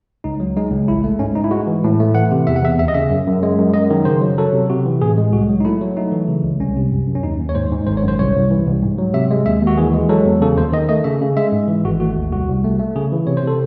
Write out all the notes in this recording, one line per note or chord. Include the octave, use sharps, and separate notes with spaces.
C#2 D#4
F#3
G#3 D#4
C#2
A1 E4
A3
G#2 C#4
G#2 D#4
E4
G#3 F#4
E3
A2
A3
E3 F#5
C3
E2 E5
F#5
E2 E5
D#2 E5
D#5
C#3 E5
F#2
F#2
G#3
F#2
F#2 D#5
D#3
C#3 C5
F#3
F#3 A4
C3
C3 F#4
E3
A2 G#4
G#3
C2 F#4
F#3
D#4
A3 E4
F#3
A3 D#4
E3
C#3
C#2
C2 C#4
C3
F#2
F#2
C#4
D#2 D#4
D#2
C#5
G#2 C5
G#2
G#1 C5
C#5
F#2 C5
C2 C#5
C2
E3
C2
G#2
F#3
C3 E5
G#3
D#2 E5
D#2
F#4
E3 G#4
G#3
F#3 A4
E2
C#3 A4
D#2 C5
D#3 D#5
A3 D#5
C#3 E5
C#3
G#3 E5
G#2
E3
G#1 F#4
A3 F#4
D#2
C2 F#4
C2
A3
A3
C#3 G#4
E3
C3 C#5
C5
C3 A4